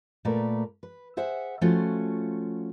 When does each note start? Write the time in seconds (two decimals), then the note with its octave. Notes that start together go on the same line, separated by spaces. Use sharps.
0.25 A#2 A3 A#4 B4 D5
0.83 B4
1.17 G#4 C5 E5 F#5
1.61 F3 A3 C#4 F4 F#4